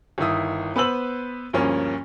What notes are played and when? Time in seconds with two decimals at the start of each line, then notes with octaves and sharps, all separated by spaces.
0.18 G1 D#3 E4 D#6
0.76 B3 B4 C5 E6 F#7
1.53 D2 G2 F3 A#3 C#4